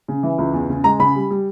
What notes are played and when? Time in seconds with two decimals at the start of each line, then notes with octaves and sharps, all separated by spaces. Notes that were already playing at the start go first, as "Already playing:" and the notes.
0.08 C#3
0.23 E3
0.38 C#2
0.53 E2
0.69 C#3
0.84 G#3 A#5
0.99 C#3 B5
1.15 G3
1.31 G3